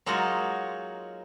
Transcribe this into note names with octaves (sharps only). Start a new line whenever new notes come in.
F#3 G#3 A#3 D#4 F4 F#4